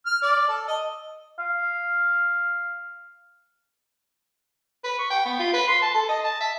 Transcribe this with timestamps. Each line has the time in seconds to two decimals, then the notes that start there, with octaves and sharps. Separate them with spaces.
0.06 F6
0.23 D5
0.49 A4
0.68 D#5
1.40 F5
4.84 B4
4.98 C#6
5.10 G5
5.25 B3
5.39 F4
5.54 B4
5.67 C6
5.82 A5
5.95 A4
6.09 D#5
6.24 A5
6.40 E5